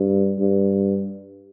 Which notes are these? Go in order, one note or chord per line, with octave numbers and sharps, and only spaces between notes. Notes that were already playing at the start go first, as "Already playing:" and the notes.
Already playing: G2
G2